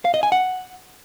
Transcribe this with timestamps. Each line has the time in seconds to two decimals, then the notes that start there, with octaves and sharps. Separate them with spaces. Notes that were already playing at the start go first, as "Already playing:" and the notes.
0.05 F5
0.14 D#5
0.23 G#5
0.32 F#5